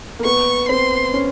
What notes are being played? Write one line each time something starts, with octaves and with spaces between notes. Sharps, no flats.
A#3
B3 C#6
C4 C6
C#4